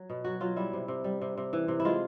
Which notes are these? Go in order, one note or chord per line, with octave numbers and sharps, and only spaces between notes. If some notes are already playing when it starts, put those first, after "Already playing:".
Already playing: F#3
B2
F#3 F#4
F#3 F4
G3 E4
C3
C3
G3
C3
C3
E3
C3
E4
G#3 F4